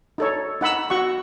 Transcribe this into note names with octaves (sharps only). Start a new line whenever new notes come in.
D#4 A4 C#5
D#4 F#5 B5 E6
F#4 F#5 C#6